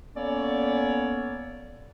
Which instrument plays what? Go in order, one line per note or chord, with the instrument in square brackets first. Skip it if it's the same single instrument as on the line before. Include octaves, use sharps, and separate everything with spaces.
[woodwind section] A#3 B3 C#4 A4 C#5 D5